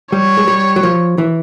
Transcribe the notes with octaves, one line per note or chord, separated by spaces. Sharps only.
G3 C#5
G#3
G3
F#3
F3
E3